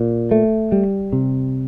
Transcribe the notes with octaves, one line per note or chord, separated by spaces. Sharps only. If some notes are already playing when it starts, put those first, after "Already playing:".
Already playing: A#2
A3
G3
C3